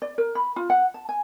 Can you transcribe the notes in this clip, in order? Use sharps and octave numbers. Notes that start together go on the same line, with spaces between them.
D5
A#4
B5
F4
F#5
A5
G#5